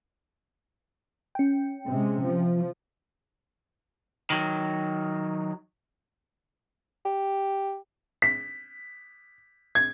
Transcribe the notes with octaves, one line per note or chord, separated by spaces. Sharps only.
C#4 G5
C3 G#3
F3
D#3 F#3
G4
B6
G#6